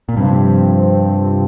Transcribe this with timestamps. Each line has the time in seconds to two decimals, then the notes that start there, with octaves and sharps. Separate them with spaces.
0.09 A#2
0.17 G2 C3 F3 C4